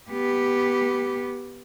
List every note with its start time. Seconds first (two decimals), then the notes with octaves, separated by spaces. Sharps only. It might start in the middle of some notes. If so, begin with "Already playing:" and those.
0.11 B3 G4